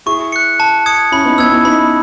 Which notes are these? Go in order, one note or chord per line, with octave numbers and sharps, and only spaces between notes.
E4 G#4 C#6
F#6 C#7
A5
D#6 G#6 C#7
C#4 E4 B5
B3 D#4
B3 D#4 E6 G#6
C#4 E4
B3 D#4 B5